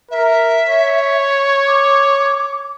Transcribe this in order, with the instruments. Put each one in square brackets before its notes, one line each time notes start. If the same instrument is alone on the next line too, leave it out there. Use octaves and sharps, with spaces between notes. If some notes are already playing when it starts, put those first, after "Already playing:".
[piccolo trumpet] A#4 [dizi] E5
[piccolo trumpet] C#5
[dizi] D6